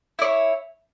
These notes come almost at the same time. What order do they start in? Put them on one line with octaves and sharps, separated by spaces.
E4 D5 C#5